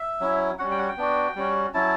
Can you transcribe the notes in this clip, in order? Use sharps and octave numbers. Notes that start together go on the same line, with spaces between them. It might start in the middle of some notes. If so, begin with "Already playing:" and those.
Already playing: E5
F#3 C#4 E4
G3 C#4 F#4 F#5
G5
F#5
G5
B3 D4 F#4
G3 C#4 F#4
F#3 C#4 E4 A5